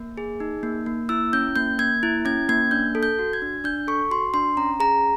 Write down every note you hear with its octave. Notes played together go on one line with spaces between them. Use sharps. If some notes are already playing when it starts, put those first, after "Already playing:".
Already playing: A#3
G#4
D#4
A#3
A#3
E4 E6
C#4 G6
A#3 G6
A#3 G#6
E4
C#4 G#6
A#3 G#6
D4 G6
A4
G6
F#4
G#6
D4
D4 G6
A4 C#6
F#4 C6
D4 C6
C#4 A#5
G#4 A#5